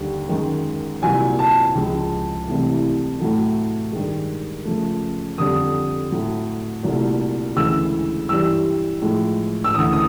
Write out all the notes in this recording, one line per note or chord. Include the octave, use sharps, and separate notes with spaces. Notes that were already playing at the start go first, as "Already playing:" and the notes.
Already playing: D#2 D3 G3
F#2 D#3 G#3
C2 A#2 F#3 G#5
A5
C#2 C#3 F3 G#3
C2 C3 E3 A3
A2 F#3 A3
G2 D#3 G#3
F#2 C#3 F3 A3
F2 D3 G3 D#6
A2 F#3 A3
C2 A#2 F#3 A3
D2 C#3 E3 G#3 E6
G2 E3 G3 E6
A2 F3 G#3
E6
D2 C#3 E3 D#6
D#6